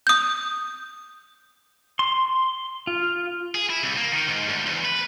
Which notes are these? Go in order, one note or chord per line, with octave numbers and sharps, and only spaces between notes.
D#6 G6
C6
F4
G#4
E4
C2
A#3
D#3
G#2
D2
E2
B4